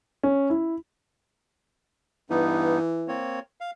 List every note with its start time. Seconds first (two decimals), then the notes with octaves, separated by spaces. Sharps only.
0.23 C#4
0.50 E4
2.30 G2 E3 B3 D#4
3.08 A#3 C4 C#5
3.61 F5